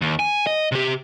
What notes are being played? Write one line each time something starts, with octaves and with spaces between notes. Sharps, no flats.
D#2
G#5
D#5
C3 G4